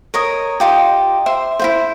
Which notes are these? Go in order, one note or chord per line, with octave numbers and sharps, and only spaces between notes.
A#4 C#5 D#5 D#6
D#4 F4 G4
C5 E5 C6
E4 F4 C5